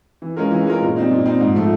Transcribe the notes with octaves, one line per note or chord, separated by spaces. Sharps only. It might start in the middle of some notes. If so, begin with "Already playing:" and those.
E3
G#3 C#4 F4 A#4
E3
G#3 C#4 F4 A#4
A#2
G3 C4 D#4
A#2
G3 C4 D#4
G#2
F3 A3